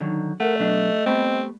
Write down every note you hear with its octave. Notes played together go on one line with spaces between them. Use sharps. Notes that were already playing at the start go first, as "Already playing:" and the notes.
D3 D#3 F#3 D#4
A3 A#4 F#5
B2 F#3 D4 D#5
G3 A3 B3 C4